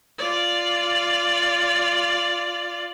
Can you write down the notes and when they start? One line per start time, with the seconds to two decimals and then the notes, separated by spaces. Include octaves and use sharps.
0.18 F4 D5